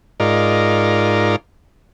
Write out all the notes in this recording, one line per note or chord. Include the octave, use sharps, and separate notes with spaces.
G#2 D#4 F4 A#4 D5